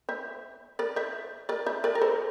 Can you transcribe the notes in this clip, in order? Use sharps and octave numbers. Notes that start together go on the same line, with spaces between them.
C5 E5
A#4 D5
C5 E5
A#4 D5
C5 E5
A#4 D5
A#4
A4 C5